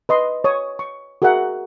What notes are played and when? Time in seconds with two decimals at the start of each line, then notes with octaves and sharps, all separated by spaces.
0.09 B4 D#5 C6
0.44 C#5 D#6
0.79 C#6
1.22 F#4 G#4 A#4 E5 F#5